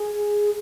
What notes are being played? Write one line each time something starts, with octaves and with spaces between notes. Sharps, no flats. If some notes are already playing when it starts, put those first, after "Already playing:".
Already playing: G#4